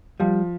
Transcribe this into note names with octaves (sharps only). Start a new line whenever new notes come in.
F3 G3